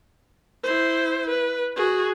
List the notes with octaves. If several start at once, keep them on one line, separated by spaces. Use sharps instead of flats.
E4 C5
B4
F#4 G#4